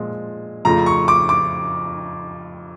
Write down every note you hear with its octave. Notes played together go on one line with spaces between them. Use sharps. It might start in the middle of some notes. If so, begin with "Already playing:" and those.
Already playing: A#2 F3 G#3
F2 C#3 F3 A3 A#5
C#6
D6
D6